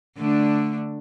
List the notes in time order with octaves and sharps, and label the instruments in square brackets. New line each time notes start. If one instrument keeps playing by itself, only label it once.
[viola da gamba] D3 A3 D4